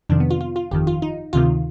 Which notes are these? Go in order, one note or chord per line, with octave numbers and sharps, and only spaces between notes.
F2 C3 D#3 D4
B3
F4
F4
F4
G1 F2 D#3 G4
F4
D#4
D2 C3 D#3 F4